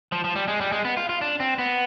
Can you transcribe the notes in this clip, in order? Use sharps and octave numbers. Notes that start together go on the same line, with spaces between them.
F3
F3
G3
G#3
G3
G#3
B3
F4
F4
D4
C4
B3